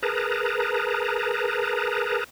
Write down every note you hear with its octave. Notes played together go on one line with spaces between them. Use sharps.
G#4 A#4 B4 A5 A#5